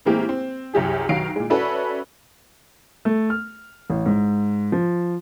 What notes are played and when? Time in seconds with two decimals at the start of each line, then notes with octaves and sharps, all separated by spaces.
0.05 A2 E3 G#3 A#3 C4 G4
0.29 C4
0.74 C2 F#2 G4 G#4
1.09 B1 D#3 F#3 F5 C7 D7
1.36 A#2 G#3
1.50 C#4 F#4 A4 B4 D5 E5
3.05 A3
3.30 F6
3.90 A1
4.06 G#2
4.72 F3